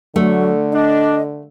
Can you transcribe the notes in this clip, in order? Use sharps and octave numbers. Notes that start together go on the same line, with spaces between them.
D3 F#3 A3
D4 D#5